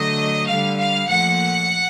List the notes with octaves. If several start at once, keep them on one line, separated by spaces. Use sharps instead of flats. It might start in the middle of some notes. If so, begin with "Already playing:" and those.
Already playing: D3 F#3 A3 D#5
D3 G3 F5
F5
A#2 F3 A3 F#5